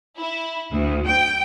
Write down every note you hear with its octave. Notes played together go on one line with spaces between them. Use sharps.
E4
D2
G5